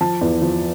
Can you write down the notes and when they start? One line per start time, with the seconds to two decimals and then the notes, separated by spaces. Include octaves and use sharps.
0.01 F3 A5
0.21 E2
0.42 F3